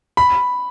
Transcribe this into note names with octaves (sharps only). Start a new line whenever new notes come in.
B5